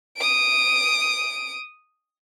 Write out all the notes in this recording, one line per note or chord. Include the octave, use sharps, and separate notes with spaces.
D#6 D7